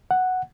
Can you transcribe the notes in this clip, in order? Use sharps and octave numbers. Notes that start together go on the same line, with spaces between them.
F#5